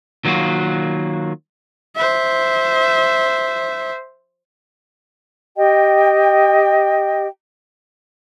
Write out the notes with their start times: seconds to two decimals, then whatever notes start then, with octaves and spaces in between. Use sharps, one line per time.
0.25 D#3 F#3 A#3 F4 F#4
1.96 C5 E5
5.57 G4 D#5 G5